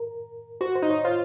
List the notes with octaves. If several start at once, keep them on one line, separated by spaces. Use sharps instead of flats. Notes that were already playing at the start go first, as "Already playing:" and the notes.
Already playing: A#4
F#4 C5
C5
D#4
C#5
F4 C5